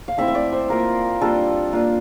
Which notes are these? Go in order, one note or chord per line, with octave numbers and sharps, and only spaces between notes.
F5
A3 C4 E4 E5
E5
D5
C5
A#3 F4 A#4
G3 A#3 D4 F4 A4
A#3 D4 F4